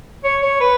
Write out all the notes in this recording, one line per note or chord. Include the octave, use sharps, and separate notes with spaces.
C#5
C#5
B4